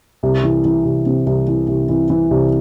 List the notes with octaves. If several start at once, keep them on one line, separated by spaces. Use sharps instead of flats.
C2
E3
E3
C2
C3
C2
E3
C2
E3
E3
C2